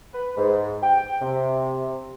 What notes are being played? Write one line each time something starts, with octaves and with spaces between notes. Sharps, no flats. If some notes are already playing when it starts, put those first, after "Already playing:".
B4
G#2
G5
C3